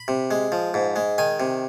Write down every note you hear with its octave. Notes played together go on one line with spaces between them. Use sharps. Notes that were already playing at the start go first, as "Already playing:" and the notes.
Already playing: B5
C3
G#3
F3
G#2
G#3
D#3 G#5
C3